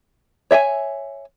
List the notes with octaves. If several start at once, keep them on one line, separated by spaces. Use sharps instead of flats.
C#5 E5 G5 G#5